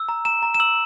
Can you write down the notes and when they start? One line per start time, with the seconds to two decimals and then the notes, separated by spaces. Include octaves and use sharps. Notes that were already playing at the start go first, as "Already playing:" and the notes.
Already playing: E6
0.09 A#5
0.25 A#5 E7
0.43 A#5
0.54 E7
0.60 E6 F#7